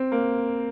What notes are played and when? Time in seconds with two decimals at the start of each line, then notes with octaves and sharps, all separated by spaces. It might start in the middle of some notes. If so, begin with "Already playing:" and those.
Already playing: C4
0.12 A#3